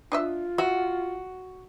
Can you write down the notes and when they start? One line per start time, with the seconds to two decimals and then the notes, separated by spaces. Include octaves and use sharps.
0.12 D4 F4 D#5 E5
0.58 F#4 E5